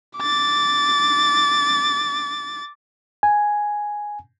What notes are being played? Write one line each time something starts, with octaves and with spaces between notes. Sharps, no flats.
D6 A6
G#5